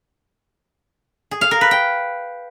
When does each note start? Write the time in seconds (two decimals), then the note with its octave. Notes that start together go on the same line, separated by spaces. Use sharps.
1.31 G#4
1.41 F5
1.51 A#4
1.61 B4
1.71 G5